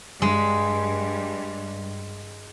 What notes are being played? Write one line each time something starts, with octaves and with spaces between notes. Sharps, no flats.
G2 G#3